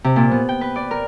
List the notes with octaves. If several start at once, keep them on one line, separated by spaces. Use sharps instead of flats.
C3
A#2
B3
G5
B4
D5
A#4